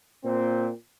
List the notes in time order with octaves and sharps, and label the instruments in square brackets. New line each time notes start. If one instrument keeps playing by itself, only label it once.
[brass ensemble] A#2 C4